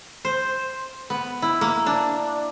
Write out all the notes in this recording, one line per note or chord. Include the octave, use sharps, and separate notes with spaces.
C5
B3
E4
A#3
D4